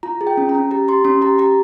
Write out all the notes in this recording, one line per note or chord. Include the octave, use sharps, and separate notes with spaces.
F4 A#5
G#4
G5
C#4
A#5
C#4
G4 A#5
G4 C6
C#4 C6
G4 A#5
G4 A#5